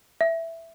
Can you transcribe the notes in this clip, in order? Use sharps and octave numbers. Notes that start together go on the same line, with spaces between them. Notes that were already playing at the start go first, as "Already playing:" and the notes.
E5